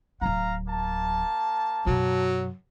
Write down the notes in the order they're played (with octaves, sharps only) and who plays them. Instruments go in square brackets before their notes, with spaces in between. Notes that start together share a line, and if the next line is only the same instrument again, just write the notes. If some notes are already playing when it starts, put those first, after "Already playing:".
[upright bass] D1 F#3 [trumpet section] F5 A#5
[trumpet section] A#3 A5
[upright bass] F#2 B2 [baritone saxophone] F#3